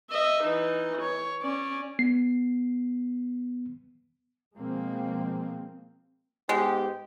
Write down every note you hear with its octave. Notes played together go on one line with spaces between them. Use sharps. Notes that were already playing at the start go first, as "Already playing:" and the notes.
D#5 E5
E3 D#4
C#5
C#4 D5
B3 C7
B2 F3 G#3 A#3 C4
G#2 G#3 B3 G4